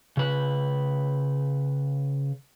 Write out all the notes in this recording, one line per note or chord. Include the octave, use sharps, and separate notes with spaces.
C#3 B4